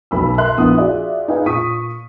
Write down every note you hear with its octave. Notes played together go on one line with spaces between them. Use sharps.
B1 B5 E6
A#4 E5 C6 F#6
A#1 B3 E4 F#5 D#6
F4 F#4 G#4 D5 E5
D#4 G#4 B4 F5 G#5
A#2 C#6 D#6 B6 D#7